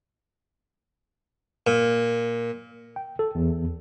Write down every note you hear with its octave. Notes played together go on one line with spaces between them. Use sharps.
A#2
G5
A4
E2